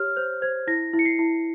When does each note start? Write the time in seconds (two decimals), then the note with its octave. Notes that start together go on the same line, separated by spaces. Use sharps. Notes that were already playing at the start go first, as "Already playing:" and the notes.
Already playing: G4 C#5 F6
0.16 C5 G6
0.42 C5 G#6
0.67 E4 A#6
0.93 E4
0.99 C#7
1.05 C7
1.19 E4